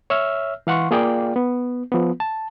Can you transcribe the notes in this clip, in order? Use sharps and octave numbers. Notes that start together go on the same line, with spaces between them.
C#5 E5 E6 F6
E3 F5 F#5 C6 C#6
A#3 F4 G#4 D5 F5 G5
B3
F3 B3
A5